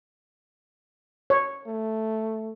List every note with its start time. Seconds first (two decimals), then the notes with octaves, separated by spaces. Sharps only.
1.30 C#5
1.67 A3